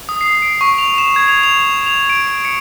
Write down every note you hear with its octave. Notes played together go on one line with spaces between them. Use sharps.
D#6
C7
D7
C#6
F7
E7
G#6
F7
F7
F7
D7
C#7